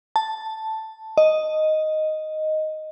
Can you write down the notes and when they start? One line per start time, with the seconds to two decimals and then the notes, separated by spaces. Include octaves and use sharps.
0.16 A5
1.18 D#5